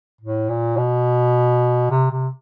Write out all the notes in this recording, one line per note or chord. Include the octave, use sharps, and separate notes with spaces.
A2
A#2
B2
C3
C3